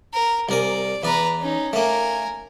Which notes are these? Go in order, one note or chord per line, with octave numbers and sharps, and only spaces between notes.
A#4
C2 A#4 D5 G#5
E2 B4 D5 A#5
C#4 D#4
A3 A#3 A#4 G#5